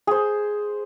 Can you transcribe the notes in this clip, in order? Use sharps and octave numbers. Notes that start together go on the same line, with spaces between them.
G#4 C5